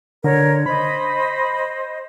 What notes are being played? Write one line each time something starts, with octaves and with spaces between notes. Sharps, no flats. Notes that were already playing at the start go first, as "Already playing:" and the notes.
D3 A#4 C#5
C5 D#5 B5